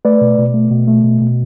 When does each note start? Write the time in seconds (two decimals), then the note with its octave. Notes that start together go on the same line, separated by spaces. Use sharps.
0.05 A3 B4 D5
0.21 B2
0.38 B2
0.54 A3
0.71 B2
0.88 A3
1.04 B2
1.21 B2